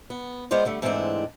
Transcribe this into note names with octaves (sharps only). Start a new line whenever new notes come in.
B3
G#3 B3 F4 C5 D5
D3 G3 A3
G#2 E3 G#3 A3 C4 D4